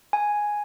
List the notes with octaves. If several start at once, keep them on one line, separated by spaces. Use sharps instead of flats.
G#5